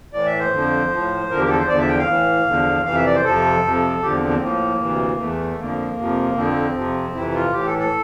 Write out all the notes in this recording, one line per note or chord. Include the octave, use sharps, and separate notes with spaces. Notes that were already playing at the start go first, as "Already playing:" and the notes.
A2 E3 D5
E5
C5
F2 D3 F3
A2 F3
E2 D3 F3 A#4
G4
A4
C5
E2 D3 F3 D5
E5
G5
F5
A2 E3
E2 D3 F3
F2 C3 E3 F5
E5
D5
C5
F2 C3 F3 A4
F2 C3 F3
E2 D3 F3 G4
C4
C4
A2 F3 A#3
D2 C3 E3
E2 E3 A3
F2 D3 F3 A#3
F2 C3 F3
F2 D3 F3 C4
F2 C3 F3
F2 C3 E3 E4
F4
A2 E3 G4
A4
A4